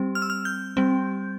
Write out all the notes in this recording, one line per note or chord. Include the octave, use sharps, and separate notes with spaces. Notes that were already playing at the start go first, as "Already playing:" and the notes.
Already playing: G3 C4
F6
E6
F6
G6
G3 C4